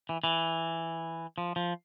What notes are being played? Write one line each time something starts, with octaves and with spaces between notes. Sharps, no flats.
E3
E3
F3
F3